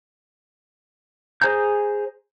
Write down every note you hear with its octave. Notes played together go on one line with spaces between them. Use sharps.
G#4 C5 G#5 A#5 G6